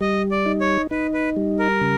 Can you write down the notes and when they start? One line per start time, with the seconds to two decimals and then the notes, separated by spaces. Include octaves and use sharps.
0.01 G3 D#5
0.31 D5
0.46 D#4
0.61 C#5
0.91 D#4 B4
1.14 B4
1.36 G3
1.59 A#4
1.81 C#3